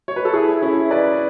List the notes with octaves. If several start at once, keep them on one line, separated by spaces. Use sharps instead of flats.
C#5
B4
A4
E4 G#4
C#4 E4
B4 D5